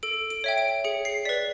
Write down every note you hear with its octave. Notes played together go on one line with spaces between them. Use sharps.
A4 D7
D7
C#5 E5 G5
D7
G#4 C#7
C7
B4 D5 B6